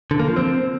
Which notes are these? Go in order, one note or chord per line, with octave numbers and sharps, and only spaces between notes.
D3
A#3
F3
C4